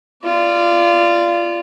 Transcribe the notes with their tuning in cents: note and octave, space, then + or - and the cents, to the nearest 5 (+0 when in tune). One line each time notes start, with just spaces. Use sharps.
F4 -20 D5 +0